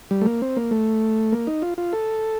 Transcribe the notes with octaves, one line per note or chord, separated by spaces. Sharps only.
G3
A3
A#3
C4
A#3
A3
A#3
D#4
F4
F4
A4